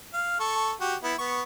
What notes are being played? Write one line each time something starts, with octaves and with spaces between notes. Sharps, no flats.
F5
A4 C#6
F#4 G4
B3 E4
B3 C#6